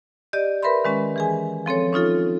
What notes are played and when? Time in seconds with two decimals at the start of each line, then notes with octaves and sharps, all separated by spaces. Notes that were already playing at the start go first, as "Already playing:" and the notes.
0.33 G4 D5 D#5
0.63 A#4 B4 E5 B5 C6
0.85 D#3 G#3 C#4
1.16 E3 G#4 G#5
1.66 F3 C4 A4 C#5
1.93 C#4 D#4 F4 A4